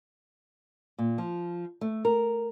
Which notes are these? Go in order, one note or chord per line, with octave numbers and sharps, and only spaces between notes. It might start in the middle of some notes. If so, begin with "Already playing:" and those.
A#2
F3
A3
A#4